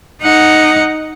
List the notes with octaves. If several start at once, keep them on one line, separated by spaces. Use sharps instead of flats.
D#4 F#5